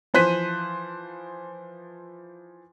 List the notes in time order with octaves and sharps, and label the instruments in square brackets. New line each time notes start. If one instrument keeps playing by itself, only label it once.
[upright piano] E3 F3 C5 F#6 B6 D#7